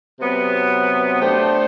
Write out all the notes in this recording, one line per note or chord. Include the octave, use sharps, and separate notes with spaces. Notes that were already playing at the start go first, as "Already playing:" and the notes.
C3 F#3 B3
A3 D4 G4 C5